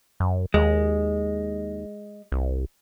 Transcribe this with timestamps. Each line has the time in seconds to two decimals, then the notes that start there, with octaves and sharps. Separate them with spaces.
0.20 F#2
0.54 D#2 G#3
2.32 C2